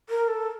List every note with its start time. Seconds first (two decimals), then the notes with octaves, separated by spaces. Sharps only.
0.09 A#4
0.28 A4